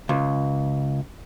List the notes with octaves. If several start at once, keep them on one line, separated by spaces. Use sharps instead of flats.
C#2